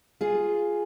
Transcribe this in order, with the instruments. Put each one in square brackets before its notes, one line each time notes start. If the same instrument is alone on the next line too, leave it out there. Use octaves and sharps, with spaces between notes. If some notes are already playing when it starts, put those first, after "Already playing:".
[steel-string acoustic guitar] F4 G#4